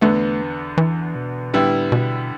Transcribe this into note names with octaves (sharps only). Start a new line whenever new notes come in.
E2 D3 A3 B3
E3
B2
A2 D3 G3 B3 E4
B2